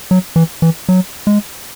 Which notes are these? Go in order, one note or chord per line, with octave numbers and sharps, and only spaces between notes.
F#3
E3
E3
F#3
G#3